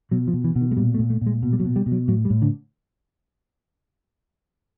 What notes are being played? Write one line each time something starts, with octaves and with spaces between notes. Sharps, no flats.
B2 F#3
F3
B2
E3
B2
D#3
G#3
A#2 G3
A3
A#2
A3
A#2
G#3
B2
G3
F#3
B2
G3
B2
F#3
A2 F#3
G3
A2
D3